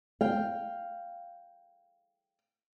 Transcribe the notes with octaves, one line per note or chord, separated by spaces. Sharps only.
F5 G5